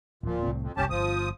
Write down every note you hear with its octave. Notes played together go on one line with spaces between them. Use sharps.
D1 A#2 F3
C2 A2 C4
F2
F#1 C2 C#4 G4 A5
G1 F3 D#6